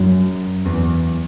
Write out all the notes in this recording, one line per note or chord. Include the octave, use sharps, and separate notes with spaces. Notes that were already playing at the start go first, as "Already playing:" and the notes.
Already playing: F#2
E2